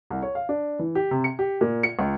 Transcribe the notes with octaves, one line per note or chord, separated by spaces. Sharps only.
C2
C#5
F5
D4
E3
G4
C3
C#7
G4
A#2
C#7
C#2